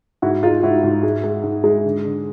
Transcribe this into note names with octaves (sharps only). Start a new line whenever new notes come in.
G#2 E4 F#4
G#3 D#4 F4
G#2 E4 F#4
G#2
G#3
G#3
G#2
G#3
D3
D3